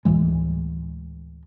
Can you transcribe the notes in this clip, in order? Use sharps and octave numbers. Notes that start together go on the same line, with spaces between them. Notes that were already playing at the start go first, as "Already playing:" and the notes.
D2 A2 E3 G#3